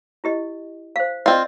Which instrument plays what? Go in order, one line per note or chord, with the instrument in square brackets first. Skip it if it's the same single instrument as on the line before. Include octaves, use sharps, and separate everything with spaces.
[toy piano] E4 G4 D#5
C5 F5
[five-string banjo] C4 F4 [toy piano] D5 D#5